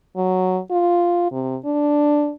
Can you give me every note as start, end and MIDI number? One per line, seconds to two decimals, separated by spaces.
0.16 0.59 54
0.71 1.30 65
1.32 1.56 48
1.65 2.32 62